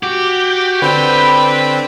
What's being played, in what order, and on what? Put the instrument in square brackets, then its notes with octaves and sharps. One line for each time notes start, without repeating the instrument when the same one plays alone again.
[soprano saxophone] F#4 [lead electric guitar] G4
[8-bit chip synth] D3 C4 [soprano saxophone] B4